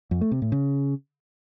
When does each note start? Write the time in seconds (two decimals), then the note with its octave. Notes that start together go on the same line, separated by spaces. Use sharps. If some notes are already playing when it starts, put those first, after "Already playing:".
0.11 F2
0.21 A3
0.32 C3
0.42 A2
0.52 C#3